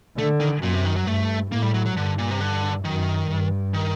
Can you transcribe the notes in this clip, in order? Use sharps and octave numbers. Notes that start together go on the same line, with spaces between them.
D3 A3
D#3
F#2 A#2
C3
D#3
F#3
G2 A3
A2 A#3
G3
F#3
F#3
G2 D3
A#2
C3
D3
F#2 D#3
G2
D#3